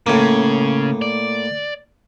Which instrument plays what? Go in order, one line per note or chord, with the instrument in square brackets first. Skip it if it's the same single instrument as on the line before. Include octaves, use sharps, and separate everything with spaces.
[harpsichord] A2 A#3 [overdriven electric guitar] C#3
[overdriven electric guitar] D5